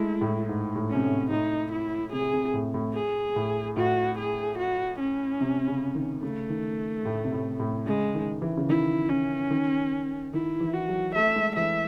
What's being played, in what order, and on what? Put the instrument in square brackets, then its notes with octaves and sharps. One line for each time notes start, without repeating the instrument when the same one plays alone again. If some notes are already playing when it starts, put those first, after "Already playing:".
Already playing: [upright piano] G#3 A3 [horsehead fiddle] E4
[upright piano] A2
G#2
A2
[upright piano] C3 [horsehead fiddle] C#4
[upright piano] A2
[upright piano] A2 [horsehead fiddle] D#4
[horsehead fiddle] E4
[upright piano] C3 [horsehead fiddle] G#4
[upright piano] C3
A2
A2
[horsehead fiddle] G#4
[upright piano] A2
[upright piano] A2 [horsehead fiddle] F#4
[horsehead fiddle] G#4
F#4
C#4
[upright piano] C3
C#3
D#3
[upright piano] C#3 [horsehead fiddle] A3
[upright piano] D#3
A2
C3
A2
A2
[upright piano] C#3 [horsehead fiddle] G#3
[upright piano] D#3
E3
C#3
[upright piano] D#3 [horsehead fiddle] E4
[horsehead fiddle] C#4
[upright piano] D#3
[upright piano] D#3 [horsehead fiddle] E4
[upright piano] E3
[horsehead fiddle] F#4
[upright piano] F#3
[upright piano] A3 [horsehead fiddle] E5
[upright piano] G#3
[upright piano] E3 [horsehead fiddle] E5